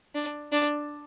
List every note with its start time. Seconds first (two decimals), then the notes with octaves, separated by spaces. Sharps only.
0.15 D4
0.52 D4